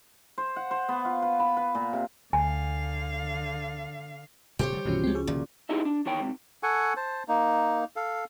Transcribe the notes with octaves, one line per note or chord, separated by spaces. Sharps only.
C5
F#5
C5
B3
F4
B4
B5
B4
A#2
C3
D2 D3 F5 G#5
D#1 C3 G3 G4 C5 C#5
D3 F3 G3
C2 G2 B2 D#3 E3 C#4 F4 F#4
C#2 F3 G#3 C4
C#3 C#4 G#4
C2 A#2 D#3 F3
D#4 E4 G4 G#4 D#5 E5
D4
E2 D#3 C#5 G5
G#2 C3
A4 F#5 G#5 C#6
C5 A5
A#3 D#4
A4 F5